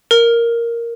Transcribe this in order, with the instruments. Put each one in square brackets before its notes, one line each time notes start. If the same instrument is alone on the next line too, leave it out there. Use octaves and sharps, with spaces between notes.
[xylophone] A#4